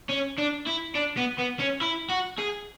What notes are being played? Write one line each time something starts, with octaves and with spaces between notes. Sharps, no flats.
C#4
D4
E4
D4
B3
B3
C#4
E4
F#4
G#4